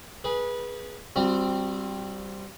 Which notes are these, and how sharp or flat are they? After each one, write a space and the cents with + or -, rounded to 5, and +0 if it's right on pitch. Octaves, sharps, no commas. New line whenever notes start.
G#4 +0 B4 -20
G3 +0 C4 +0 F#4 -40